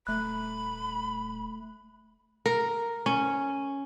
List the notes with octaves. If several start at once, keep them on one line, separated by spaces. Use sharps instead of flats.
D#1 A3 B5 F#6
A#4
C#4